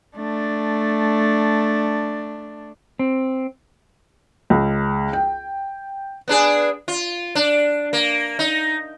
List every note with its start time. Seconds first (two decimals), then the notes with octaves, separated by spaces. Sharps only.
0.17 A3 D4
2.99 C4
4.50 C#2
5.13 G5
6.28 B3 D4 G#4
6.88 F4
7.35 D4
7.93 A#3
8.39 D#4